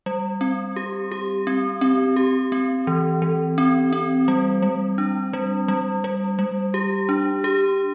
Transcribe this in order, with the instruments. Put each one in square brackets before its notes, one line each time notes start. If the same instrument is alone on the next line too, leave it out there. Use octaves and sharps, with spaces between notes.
[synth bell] G3
C4
G4
G4
C4
C4
G4
C4
E3
E3
C4
C4
G3
G3
D4
G3
G3
G3
G3
G4
D4
G4